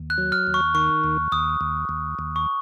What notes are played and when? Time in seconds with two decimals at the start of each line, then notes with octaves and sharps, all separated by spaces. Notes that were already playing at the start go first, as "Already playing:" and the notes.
Already playing: D#2
0.10 F#6
0.18 F#3
0.32 F6
0.47 D#2
0.54 C#6
0.74 D#3 C#6
1.04 D#2
1.32 D#2 D#6
1.61 D#2
1.89 D#2
2.19 D#2
2.36 C#6